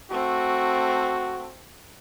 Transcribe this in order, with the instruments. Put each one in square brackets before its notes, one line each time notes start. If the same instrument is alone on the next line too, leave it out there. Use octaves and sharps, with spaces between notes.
[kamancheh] A3 C4 [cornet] F#4